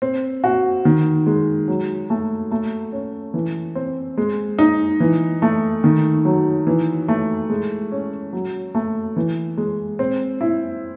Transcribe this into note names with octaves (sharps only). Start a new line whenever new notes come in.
C4
F#4
D#3
G#3
F#3
A3
A3
C#4
E3
C4
G#3
D#4
E3
A3
D#3
F#3
E3
A3
G#3
C#4
F#3
A3
E3
G#3
C4
E4